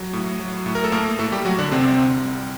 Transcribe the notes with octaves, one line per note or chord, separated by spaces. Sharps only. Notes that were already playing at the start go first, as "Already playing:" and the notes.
Already playing: F#3
A2
F#3
A2
A#4
A4
A2 A#3 A#4
A2 A3 A4
G3 G4
F#3 F#4
D3 D4
C2 C3 C4
C2
G3